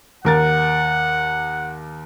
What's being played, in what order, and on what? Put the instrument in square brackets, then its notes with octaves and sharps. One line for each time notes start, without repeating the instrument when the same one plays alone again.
[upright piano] D#2 A#4 A6 [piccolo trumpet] F#5